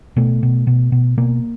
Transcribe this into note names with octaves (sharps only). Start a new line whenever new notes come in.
B2 A3
B2
B2
B2
B2 A#3